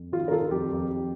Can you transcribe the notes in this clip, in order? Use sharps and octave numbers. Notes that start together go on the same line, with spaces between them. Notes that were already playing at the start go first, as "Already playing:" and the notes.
Already playing: F2
D#3 F4
A#4
D#3 F4 A4
F2 G4
F2
F2